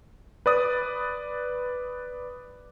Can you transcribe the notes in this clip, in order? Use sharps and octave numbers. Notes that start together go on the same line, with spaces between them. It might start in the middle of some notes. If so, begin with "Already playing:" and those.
B4 D5 D#6